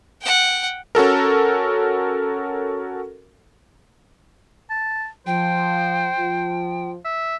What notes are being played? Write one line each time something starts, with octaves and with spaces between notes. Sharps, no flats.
F#5 G5
C#4 F#4 A4 A#4
A5
F3 C5 G5
F3 F4
E5